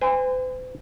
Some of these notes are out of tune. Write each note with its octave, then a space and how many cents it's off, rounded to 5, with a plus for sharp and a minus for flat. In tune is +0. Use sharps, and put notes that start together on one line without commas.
C5 -45 G#5 -40